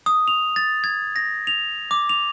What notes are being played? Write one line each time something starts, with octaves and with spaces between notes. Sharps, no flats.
D#6
F7
A6
G#6
A#6
F7
D6
F7